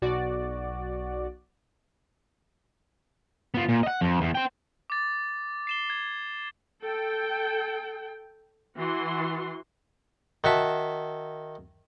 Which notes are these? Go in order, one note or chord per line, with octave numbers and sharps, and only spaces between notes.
B1 F#4 D5
B3 F4
A#2
D#5 F#5
F2
E2
C5 G5
D6 A6
C7 E7 G7
G#6
A4 G5
E3 F#4 C6
D#3 F#4 E5 A5